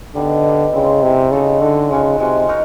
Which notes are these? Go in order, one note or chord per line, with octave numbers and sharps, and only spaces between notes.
D3 G3 B3 D#4
G3 B3 D#4
C#3 G#3 C4 E4
C3 G#3 C4 E4
C#3 D#4 F#4 A4
D3 D#4 F#4 A4
C#3 F3 G#3 C#4 F#4
C3 F3 G#3 C#4 F#4
D#4 F#4 A#4